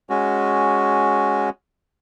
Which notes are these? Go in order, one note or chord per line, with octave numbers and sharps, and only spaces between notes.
G#3 C#4 F#4